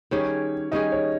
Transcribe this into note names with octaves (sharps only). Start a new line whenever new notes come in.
D#3 G3 C#4 G#4 C#5
D#3 G3 C#4 G#4 D#5
C#5